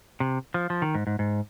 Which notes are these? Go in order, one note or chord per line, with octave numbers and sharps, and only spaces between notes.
C3
F3
F3
D#3
G#2
G#2
G#2